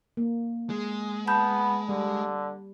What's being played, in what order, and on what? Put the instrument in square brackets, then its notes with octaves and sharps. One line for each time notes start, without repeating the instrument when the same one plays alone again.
[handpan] A#3
[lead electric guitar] G#3
[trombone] B3 [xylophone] A5 B5 G6
[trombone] D3 [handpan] G3